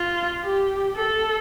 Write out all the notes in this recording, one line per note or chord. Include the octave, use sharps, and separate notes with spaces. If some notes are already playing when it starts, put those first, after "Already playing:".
Already playing: F4
G4
A4